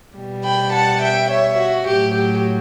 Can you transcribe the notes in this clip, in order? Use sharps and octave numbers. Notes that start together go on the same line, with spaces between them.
B2 G3
G5 B5
F#5 A5
E5 G5
C#5 E5
F#4
A2 F#3 G4
G4